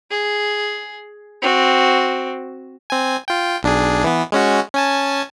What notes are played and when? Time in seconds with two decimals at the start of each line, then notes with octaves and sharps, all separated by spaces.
0.11 G#4
1.42 C4 F#4
2.90 C4 G#5
3.28 F4 G5
3.63 B1 D4 G#4
4.04 E3 B3
4.32 G#3 C#4 F#4
4.74 C#4 G#5 A5